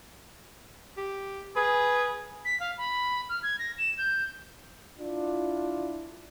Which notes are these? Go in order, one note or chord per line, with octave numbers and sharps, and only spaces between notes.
G4
G#4 B4
B6
F5
B5
F6
G#6
A#6
E7
G6
D4 E4 F4